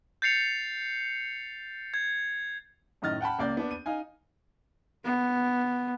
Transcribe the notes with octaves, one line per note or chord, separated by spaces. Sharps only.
G6 A6 C7 C#7 F7
G#6
F#2 A2 D#3 D#5 F6 A6
F#5 G5 A5 B5
C#2 A#3 D5 G6
B3 D4
D#7
D#4 F5 G#5
B3